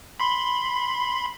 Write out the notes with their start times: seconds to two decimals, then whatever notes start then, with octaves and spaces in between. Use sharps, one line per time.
0.20 B5 C6